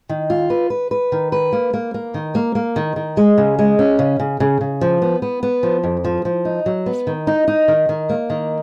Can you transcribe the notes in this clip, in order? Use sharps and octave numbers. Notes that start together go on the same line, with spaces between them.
D#3
F4
B4
B4
B4
D#3
B4
A#3
A#3
A#3
D#3
A#3
A#3
D#3
D#3
G#3
C#3
G#3
C#4
C#3
C#3
C#3
C#3
F3
B3
B3
B3
F3
F2
F3
F3
D#4
F#3
B3
D#3
D#4
D#4
D#3
D#3
A#3
D#3